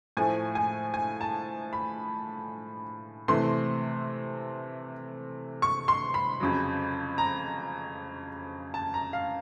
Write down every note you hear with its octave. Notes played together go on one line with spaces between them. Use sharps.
A2 F3 A3 G#5
G#5
G#5
A5
B5
C3 E3 A3 C6
C#6
C6
B5
F2 C#3 F#3
A#5
A5
A#5
F5